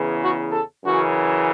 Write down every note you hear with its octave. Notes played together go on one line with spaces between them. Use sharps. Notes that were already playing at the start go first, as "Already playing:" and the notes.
Already playing: E2 C#3 E3
F#4
A4
F#2 C#3 E3 F#4